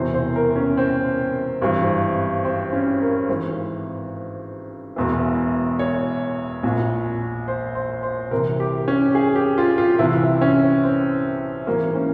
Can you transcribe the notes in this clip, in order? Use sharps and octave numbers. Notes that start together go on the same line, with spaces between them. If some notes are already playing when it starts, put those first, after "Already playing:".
Already playing: E1 E2 C3 E3 C5
C5
A#4
C#4
C4
G#1 G2 E3
C4
C#4
A#4
G#1 G#2 E3 C5
E1 E2 E3
C#5
A#1 A#2
C5
C5
C5
C2 C3 E3 A#4
G4
C#4
G#4
G4
F4
F4
C2 C3 E3 E4
C#4
C4
G#1 G#2 E3 A#3
C#4